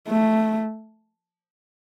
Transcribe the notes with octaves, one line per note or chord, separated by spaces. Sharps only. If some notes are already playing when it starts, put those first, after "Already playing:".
A3